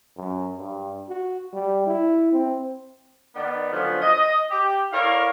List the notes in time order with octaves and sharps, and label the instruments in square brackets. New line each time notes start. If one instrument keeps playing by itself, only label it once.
[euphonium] F#2
G2
F#4
G3
E4
C4
[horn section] D#3 B3 D5
D3 F3 F#3 B3 C#4 F4
D#5
G4
E4 A4 A#4 C#5 D5 F5